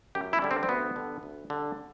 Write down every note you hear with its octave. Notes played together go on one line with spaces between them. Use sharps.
F#2 G4
E4
D3 G3
C4
C4
D2 B3
D3 G3
D2
D3 G3